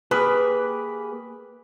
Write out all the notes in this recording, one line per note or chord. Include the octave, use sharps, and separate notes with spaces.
A#3 G4 G#4 B4